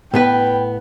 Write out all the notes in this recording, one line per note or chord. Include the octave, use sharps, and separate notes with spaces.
A2 B3 B4 G5